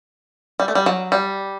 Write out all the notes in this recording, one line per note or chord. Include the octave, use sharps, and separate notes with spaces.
G3
A3
G3
F#3
G3